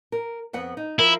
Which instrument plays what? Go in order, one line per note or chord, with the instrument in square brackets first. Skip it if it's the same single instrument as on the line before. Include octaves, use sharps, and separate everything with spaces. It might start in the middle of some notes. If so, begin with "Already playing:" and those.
[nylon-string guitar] A#4
F2 B3 F#5
D#4
[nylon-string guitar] F3 A#4 [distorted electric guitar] E4